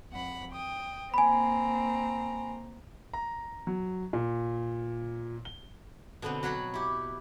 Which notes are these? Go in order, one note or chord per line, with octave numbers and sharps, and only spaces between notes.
F2 F#5 B5
G5 D#6
A#3 C4 G#5 A#5 B5
A#5
F#3
A#2
G7
B2 D3 B3 C4
F#3 F#4 C#5 F#5 B5
E4 G4